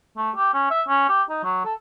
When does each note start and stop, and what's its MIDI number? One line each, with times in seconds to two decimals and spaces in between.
0.17 0.31 57
0.36 0.53 67
0.54 0.68 61
0.71 0.82 76
0.88 1.08 61
1.09 1.23 67
1.30 1.39 63
1.44 1.62 54
1.65 1.74 69